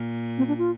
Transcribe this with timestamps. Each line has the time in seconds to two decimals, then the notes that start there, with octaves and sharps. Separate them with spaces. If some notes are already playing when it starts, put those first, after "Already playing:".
Already playing: A#2
0.38 C4
0.48 D4
0.58 F4